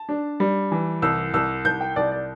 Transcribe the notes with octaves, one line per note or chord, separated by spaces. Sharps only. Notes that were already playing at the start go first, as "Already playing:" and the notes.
Already playing: A5
D4
G3
E3
C2 E6
C2 E6
C2 G6
G5
C2 D5
D5